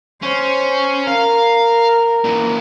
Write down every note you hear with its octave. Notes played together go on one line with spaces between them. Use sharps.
C#4 C5
A#4 F5
A#2 E3